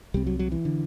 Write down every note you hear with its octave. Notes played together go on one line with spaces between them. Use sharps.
C2 C3 G3
F#3
F#3
E3
D3